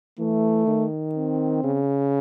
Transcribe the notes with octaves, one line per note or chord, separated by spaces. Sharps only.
E3 A3
D#3
C4
C#3